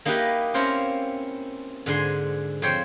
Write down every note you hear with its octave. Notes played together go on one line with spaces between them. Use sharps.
A#3 D#4 E4 G4 A#4 B4
C4 C#4 E4 F4 A#4 C5
G#2 D3 G#5 C6
F2 C5 C#5 G5